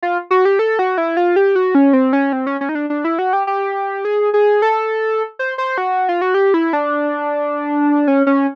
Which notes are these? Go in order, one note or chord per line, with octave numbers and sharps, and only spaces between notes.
F4
F#4
G4
A4
F#4
E4
F4
G4
F#4
C#4
C4
C#4
C4
C#4
C#4
D#4
D4
D4
E4
F#4
G4
G4
G#4
G#4
A4
C5
C5
F#4
F4
F#4
G4
E4
D4
C#4
C#4